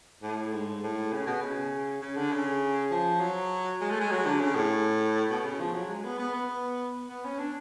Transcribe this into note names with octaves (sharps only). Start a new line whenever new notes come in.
A2
G#2
A2
C#3
B2
C#3
C#3
D3
C#3
F3
F#3
G#3
A3
G#3
F#3
D3
C#3
A2
B2
C#3
F3
F#3
G#3
B3
B3
B3
B3
C#4
D4